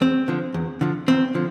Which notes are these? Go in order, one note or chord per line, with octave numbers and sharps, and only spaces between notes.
E2 C4
D3 F3
E2
D3 F3
E2 C4
D3 F3